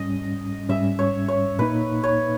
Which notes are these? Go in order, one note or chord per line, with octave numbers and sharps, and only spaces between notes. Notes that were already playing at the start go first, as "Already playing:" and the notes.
Already playing: G#2 G3 C#4 D#5
G#2 G3 C#4 E5
C#5
C#5
A#2 A#3 D#4 B4
C#5